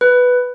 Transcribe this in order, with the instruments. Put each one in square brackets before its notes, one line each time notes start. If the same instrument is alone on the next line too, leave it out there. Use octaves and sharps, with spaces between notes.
[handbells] B4